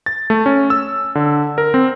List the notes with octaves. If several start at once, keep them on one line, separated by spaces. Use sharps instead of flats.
A6
A3
C#4
E6
D3
A#4
C4